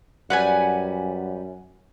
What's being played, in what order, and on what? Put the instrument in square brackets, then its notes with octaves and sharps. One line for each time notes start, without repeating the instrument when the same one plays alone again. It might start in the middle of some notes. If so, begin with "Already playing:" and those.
[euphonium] F#2 [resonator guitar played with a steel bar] G3 B4 [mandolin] F#5 G#5